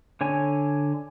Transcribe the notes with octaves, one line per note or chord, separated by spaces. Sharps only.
D3 C#5 G#5